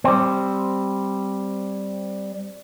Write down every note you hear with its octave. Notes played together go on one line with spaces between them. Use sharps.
G3 C4